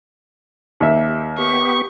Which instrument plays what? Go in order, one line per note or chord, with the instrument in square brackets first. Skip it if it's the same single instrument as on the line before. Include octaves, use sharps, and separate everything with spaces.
[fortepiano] D#2 E5 [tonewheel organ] G4
[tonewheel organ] B3 G4 [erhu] C#6